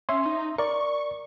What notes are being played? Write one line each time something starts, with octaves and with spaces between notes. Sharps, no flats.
C#4 E5 C6
D#4
A#4 D5 C#6